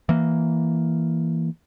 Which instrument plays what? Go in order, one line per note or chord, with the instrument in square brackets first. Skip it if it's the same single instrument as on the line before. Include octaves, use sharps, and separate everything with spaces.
[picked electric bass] E3 A#3